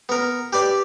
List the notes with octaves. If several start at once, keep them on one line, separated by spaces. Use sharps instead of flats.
B3 A#4
G4 B4 D5